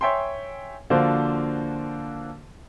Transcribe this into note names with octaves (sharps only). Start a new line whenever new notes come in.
C#5 E5 G5 G#5 C6
D3 F3 A#3 D4 F#4 C5